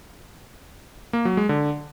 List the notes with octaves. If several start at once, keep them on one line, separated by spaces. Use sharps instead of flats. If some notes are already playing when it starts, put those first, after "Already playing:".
A#3
F#3
G#3
D3